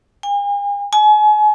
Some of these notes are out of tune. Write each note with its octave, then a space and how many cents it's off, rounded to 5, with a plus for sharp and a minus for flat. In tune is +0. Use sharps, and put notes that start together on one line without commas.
G#5 -45
G#5 +35